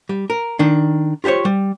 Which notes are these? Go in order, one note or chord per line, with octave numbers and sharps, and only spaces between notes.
G3
A#4
D#3 D4
F4 G4 A#4 C5 C#5
G3